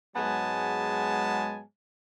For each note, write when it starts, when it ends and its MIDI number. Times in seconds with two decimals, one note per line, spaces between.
0.16 1.62 44
0.16 1.62 54
0.16 1.62 56
0.16 1.62 59
0.16 1.62 80
0.16 1.62 81